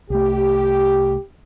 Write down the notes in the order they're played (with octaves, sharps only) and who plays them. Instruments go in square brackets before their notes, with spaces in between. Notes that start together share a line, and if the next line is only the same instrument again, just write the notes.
[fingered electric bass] C2 A3 [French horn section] G4